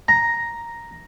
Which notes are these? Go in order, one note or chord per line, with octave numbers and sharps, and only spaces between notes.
A#5